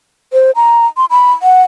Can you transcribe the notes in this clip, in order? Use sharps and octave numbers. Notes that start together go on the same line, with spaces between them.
C5
A#5
C6
B5
F#5